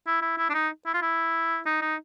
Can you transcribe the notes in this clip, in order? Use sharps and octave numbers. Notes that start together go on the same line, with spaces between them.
E4
E4
E4
D4
D#4
E4
F4
E4
D#4
D#4